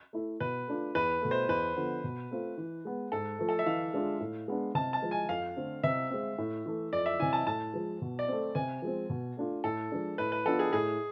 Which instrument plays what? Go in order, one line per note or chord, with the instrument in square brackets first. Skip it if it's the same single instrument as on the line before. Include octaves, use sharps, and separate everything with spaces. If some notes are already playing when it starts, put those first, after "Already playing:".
[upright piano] A3 E4
[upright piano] B2 [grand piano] B4
[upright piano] A3 D4 F4
[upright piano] E2 [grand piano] B4
[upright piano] B2 A3
[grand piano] C5
[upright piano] E2 [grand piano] B4
[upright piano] D3 F3 B3
B2
A3 C4 F4
E3
G#3 B3
[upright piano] G#2 [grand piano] A4
[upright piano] F3 A3
[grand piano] A4
E5
[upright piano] E3 [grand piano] F5
[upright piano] G#3 D4 F4
A2
G#3 B3 D4
[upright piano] C3 [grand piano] A5
[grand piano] A5
[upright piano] F3 G#3
[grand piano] G#5
[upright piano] F2 [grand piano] F5
[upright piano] D3 A3 C4
[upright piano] C3 [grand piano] E5
[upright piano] G#3 C4
A2
E3 A3
[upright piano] F2 [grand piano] D5
[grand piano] E5
[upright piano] C3 E3 [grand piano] G#5
[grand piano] A5
[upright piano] A2 [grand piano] A5
[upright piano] F3 G#3
B2
[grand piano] D5
[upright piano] A3 C4
[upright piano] C3 [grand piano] G#5
[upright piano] F3 G#3 C4
B2
A3 D4 F4
[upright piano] A2 [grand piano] A4
[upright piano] F3 G#3 D4
[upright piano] A2 [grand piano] B4
[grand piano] B4
[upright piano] F3 B3 D4 F4 [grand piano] A4
[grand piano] G#4
[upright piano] A2 [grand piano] G#4